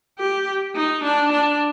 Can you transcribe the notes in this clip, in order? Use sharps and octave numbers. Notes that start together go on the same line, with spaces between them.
G4
D#4
D4
D4